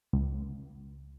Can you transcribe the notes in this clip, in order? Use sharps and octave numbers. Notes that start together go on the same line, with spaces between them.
C#2